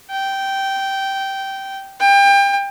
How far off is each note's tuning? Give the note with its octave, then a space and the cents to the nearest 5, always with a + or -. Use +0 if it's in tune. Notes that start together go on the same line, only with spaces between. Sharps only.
G5 -10
G5 +30